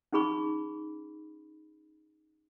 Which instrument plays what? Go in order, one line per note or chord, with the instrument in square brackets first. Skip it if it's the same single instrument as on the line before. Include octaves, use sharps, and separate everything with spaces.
[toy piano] C#4 D#4 G#4 B5 C#6